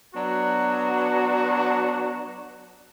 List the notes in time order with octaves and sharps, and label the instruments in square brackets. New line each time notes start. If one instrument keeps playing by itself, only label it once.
[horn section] F#3 B3 D4 F#4